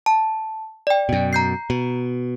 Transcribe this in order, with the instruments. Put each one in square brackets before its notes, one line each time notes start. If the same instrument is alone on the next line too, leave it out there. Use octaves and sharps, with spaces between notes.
[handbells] A5
D5 G5
[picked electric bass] F#2 B2
[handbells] A#5 G6 C7
[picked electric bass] B2